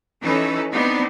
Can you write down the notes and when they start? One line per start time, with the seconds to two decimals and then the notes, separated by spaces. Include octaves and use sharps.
0.21 E3 C#4 D#4 A4 B4
0.71 B3 C4 D4 D#4